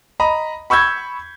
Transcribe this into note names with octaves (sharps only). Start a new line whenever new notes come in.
D#5 A#5 B5
B5 C#6 E6 G6 G#6